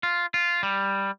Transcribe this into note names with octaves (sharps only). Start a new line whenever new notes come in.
F4
F4
G3